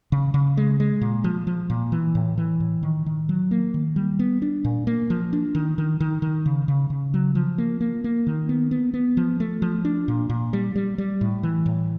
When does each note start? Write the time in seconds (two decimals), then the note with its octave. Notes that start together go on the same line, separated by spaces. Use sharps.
0.12 C#3
0.34 C#3
0.57 G#3
0.80 G#3
1.01 A#2
1.24 F3
1.47 F3
1.70 A#2
1.92 E3
2.15 A2
2.38 E3
2.60 A2
2.83 D#3
3.06 D#3
3.29 F#3
3.51 A#3
3.74 D#3
3.96 G3
4.19 B3
4.42 D4
4.65 A#2
4.87 A#3
5.10 F3
5.33 D4
5.55 D#3
5.78 D#3
6.00 D#3
6.22 D#3
6.46 C#3
6.68 C#3
6.90 C#3
7.14 F#3
7.35 F3
7.58 A#3
7.81 A#3
8.04 A#3
8.27 D#3
8.49 B3
8.71 B3
8.94 B3
9.17 F3
9.40 A3
9.62 F3
9.85 D4
10.08 A#2
10.30 A#2
10.53 G3
10.76 G3
10.98 G3
11.21 A2
11.43 E3
11.66 A2